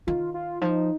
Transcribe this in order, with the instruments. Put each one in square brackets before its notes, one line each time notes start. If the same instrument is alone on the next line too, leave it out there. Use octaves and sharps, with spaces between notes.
[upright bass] D#3 [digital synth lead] F4
[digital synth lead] F4
[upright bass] F3 [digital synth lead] D#4